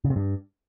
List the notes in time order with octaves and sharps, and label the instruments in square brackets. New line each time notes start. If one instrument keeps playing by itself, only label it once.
[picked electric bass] C#3
C3
G2